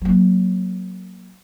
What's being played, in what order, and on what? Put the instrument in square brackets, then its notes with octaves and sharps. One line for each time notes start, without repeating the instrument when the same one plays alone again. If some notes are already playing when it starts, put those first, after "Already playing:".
[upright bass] F#3 A#3